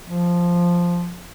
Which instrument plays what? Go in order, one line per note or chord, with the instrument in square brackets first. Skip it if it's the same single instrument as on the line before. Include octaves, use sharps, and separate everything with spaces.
[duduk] F3